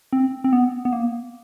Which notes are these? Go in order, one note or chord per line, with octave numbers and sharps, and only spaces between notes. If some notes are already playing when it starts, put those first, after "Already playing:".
C4
C4
B3
B3
A#3